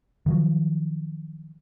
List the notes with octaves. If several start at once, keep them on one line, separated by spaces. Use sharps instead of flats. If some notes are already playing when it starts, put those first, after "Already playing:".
D#3 F3 F#3